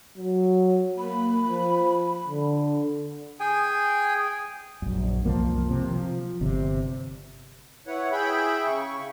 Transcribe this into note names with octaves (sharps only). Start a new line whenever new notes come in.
F#3
A#3 B5
F3
D3
G#4 G5 G#5
A#1 F#2
C2 F#2 F3 A#3
C3
F3
G1 C3
E4 B4 C#5 F#5
E4 G#4 E5 G5 B5
C#3 C#6